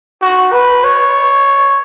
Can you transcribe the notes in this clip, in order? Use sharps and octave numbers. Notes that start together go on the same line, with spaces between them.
F#4
B4
C#5